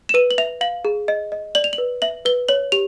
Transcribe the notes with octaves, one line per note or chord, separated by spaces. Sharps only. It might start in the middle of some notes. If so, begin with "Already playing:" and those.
E7
B4 D#7
F#7
E5 F7
F5 F#7
G#4
D#5
D#5
D5 F#7
F7
F#7
B4
E5 F#7
B4 G7
C#5 F#7
G4 F7